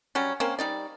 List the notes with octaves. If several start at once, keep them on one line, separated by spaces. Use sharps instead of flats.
F#3 G3 C#4
A#3 C4 C#4
G3 D#4 D5